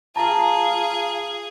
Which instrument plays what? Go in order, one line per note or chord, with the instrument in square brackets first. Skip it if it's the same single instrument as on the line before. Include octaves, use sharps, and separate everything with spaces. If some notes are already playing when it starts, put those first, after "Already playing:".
[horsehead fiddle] F4 F5 [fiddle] G#4 [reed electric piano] A5 A#5